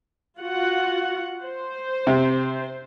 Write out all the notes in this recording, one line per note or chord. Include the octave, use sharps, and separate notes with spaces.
F4 F#4 F#5
C5
C3